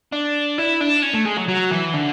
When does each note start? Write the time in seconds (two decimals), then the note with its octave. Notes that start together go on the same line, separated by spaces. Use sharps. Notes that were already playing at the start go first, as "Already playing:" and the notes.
0.13 D4
0.58 E4
0.81 D4
1.03 C#4
1.14 A3
1.26 G#3
1.37 F#3
1.48 F#3
1.71 E3
1.94 D3